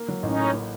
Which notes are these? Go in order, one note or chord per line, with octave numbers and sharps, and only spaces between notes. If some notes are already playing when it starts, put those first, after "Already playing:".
Already playing: A#3
F#3
A1 C#4 D#4
A2
A#3